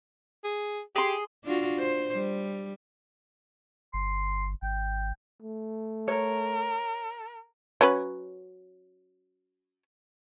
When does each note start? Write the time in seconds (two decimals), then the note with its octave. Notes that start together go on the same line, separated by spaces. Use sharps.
0.44 G#4
0.96 G4 G#4 C6
1.44 D4 F4 F#4
1.79 C5
2.15 G3
3.94 G1 C6
4.62 G#1 G5
5.42 A3
6.08 A#4 C#5
7.81 F#3 C#4 B4